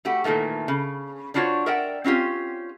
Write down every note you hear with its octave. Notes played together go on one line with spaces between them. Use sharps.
A3 F#4 G4
A#2 D#3 E3 A3 A#3
C#3
G3 D4 F4 F#4 C5 C#5
A#4 D5 E5 F#5 G5
C4 C#4 F4 G4